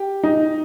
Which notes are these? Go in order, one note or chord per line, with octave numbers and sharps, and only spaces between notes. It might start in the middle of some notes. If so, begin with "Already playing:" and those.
Already playing: G4
D#4